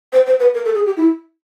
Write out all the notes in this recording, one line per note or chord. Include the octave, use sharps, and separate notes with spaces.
C5
C5
B4
A#4
A4
G#4
G4
E4